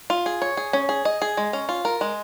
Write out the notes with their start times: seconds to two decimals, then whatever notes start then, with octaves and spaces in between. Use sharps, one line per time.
0.10 F4
0.26 G#4
0.42 C#5
0.57 G#4
0.73 C#4
0.89 G#4
1.05 D#5
1.22 G#4
1.37 G#3
1.53 C#4
1.69 F4
1.85 A#4
2.01 G#3